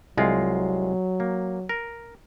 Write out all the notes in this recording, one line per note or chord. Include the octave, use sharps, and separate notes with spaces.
C2 F#3 G#3 F4
A#3
A#4